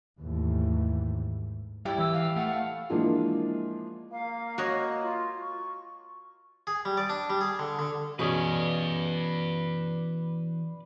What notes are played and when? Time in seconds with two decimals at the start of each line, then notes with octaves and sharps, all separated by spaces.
0.19 D#2 G#2 E3 A3
1.85 A2 G3 E4 G4 D5
1.98 E3 E6
2.14 F5
2.36 A3 F#5
2.90 E3 F3 G#3 A#3 D4 F4
4.12 A#3 F5
4.58 F#4 C#5 D#5
5.03 F4
5.41 C#6
6.67 G#4
6.85 G3
6.97 D5
7.09 D4
7.30 G3
7.41 G#4
7.59 D3
7.79 D3
8.19 B2 E3 C#4 G#4 B4 D5